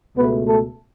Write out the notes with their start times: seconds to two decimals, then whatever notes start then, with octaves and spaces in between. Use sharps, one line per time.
0.16 C#2 B2 A3 B3 B4
0.48 A3 A4